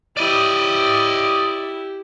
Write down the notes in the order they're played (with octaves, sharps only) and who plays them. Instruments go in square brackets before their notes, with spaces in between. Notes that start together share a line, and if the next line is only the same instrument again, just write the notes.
[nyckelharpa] E4 G4 [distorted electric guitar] D5 D#5